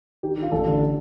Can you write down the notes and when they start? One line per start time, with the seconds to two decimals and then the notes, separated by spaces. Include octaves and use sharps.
0.23 D#3 G4
0.37 D#3
0.43 F4
0.52 A1 A4
0.66 D3